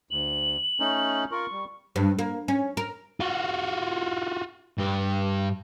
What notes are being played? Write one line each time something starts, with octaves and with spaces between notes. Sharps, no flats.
D2 F#7
A3 C#4 D#4
F4 A#4 C#6
G3
G2
A#3
C#4
A#4
F4 F#4
G2 G4